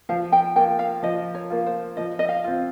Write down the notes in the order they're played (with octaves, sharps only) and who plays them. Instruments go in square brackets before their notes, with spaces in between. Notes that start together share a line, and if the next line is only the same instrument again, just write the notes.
[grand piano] F3 [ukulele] F5
[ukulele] G5
[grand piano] A#3 F4 [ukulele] G5
[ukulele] F5
[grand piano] F3 [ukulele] D#5
[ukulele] C#5
[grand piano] A#3 F4
[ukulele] C5
[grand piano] F3 [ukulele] D#5
[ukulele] D#5
F5
[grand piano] C4 F4